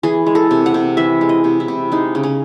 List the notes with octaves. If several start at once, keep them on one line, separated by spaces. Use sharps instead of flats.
E3 G#4
G#3
A4
C3
F#5
C3
E3 E5
G#3
D#5
C3
E4
C3
G#3 D#4
C#3
C#4